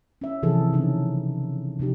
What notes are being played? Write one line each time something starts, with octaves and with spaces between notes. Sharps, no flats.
C#4 E5
C3 E3 F3 G#4 A4
C#3 E3 C#4 D#4
C3 F3 D#4 G4